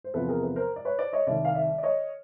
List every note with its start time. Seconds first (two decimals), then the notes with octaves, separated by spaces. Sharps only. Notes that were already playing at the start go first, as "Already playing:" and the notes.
0.04 C5
0.14 E2 C3 F3 A4 B4
0.28 G#4 A#4
0.42 A4 B4
0.56 A#4 C5
0.76 D5
0.85 B4 C#5
0.98 C5 D5
1.13 C#5 D#5
1.26 C2 C3 D#3 D5 E5
1.45 F5
1.55 D5 E5
1.78 D5
1.83 C#5 D#5